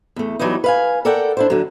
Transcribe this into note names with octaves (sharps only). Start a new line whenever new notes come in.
E2 A3
E3 F#3 G3 B3 D#4
B4 F5 G#5
A4 A#4 D5 F#5 G5
D4 E4 C5
D3 F#3